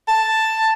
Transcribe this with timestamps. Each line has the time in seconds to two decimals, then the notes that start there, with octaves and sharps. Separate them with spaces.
0.08 A5